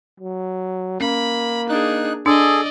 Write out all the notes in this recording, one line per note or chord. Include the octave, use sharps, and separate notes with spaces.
F#3
A#3 C#4 B5
D4 D#4 G#4 F#6
D4 G#4 A4 D5 D#5